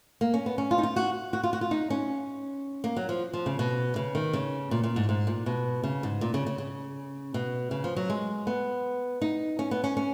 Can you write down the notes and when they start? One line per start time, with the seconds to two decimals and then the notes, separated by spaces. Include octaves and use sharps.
0.21 A#3
0.34 C#4
0.46 B3
0.58 C#4
0.71 F4
0.78 D#4
0.83 F4
0.96 F#4
1.33 F#4
1.43 F4
1.53 F#4
1.61 F4
1.71 D#4
1.90 C#4
2.84 A#3
2.96 F#3
3.09 F3
3.33 F3
3.46 C#3
3.59 B2
3.96 C#3
4.15 D#3
4.33 C#3
4.71 A#2
4.84 A#2
4.96 G#2
5.09 G#2
5.27 A#2
5.46 B2
5.83 C#3
6.03 G#2
6.21 A#2
6.34 C#3
6.46 C#3
6.58 C#3
7.34 B2
7.71 C#3
7.84 F3
7.96 F#3
8.10 G#3
8.47 B3
9.21 D#4
9.59 C#4
9.71 B3
9.84 C#4
9.97 C#4